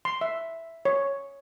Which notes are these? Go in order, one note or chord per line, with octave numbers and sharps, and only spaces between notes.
C6
E5
C#5